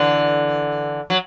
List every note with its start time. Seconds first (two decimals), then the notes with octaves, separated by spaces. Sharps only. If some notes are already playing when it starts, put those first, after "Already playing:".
Already playing: D3 E3
1.10 F#3